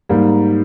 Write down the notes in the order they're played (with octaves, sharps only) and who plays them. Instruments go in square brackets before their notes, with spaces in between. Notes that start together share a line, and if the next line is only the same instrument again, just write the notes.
[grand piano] G#2 G3 A#3